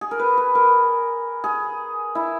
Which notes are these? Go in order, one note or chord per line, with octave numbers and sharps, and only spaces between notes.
G#4
A#4
B4
B4
A#4
G#4
E4